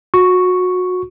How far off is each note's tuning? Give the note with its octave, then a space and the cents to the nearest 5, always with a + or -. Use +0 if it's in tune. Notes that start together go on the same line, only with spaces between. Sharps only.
F#4 -25 C#6 +0